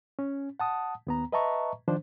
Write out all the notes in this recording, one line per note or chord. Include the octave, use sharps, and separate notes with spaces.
C#4
F#5 A5 D#6
D#2 B3 A#5
B4 D#5 E5 A5 A#5 C#6
D#3 F3 D4 C5